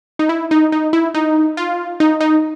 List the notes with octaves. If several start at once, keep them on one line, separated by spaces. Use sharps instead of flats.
D#4
E4
D#4
D#4
E4
D#4
F4
D#4
D#4